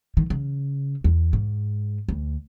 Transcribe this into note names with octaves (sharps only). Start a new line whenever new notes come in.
D#3
C#3
E2
G#2
D2